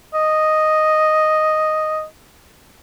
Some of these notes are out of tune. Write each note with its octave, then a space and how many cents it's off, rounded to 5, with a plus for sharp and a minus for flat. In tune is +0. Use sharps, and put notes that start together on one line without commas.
D#5 +0